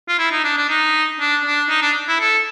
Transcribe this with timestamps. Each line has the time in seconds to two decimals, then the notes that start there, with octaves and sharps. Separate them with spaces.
0.08 F4
0.19 E4
0.32 D#4
0.44 D4
0.58 D4
0.69 D#4
1.20 D4
1.45 D4
1.69 D#4
1.82 D4
2.08 E4
2.20 A4